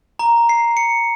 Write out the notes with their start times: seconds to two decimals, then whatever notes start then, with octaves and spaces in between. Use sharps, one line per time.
0.19 A#5
0.49 C7
0.77 C#7